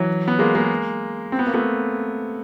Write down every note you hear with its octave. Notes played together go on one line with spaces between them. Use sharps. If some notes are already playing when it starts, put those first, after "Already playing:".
Already playing: E3 F#3
B3
G#3 A#3
G#3 A#3
C4
B3
A#3
A3 B3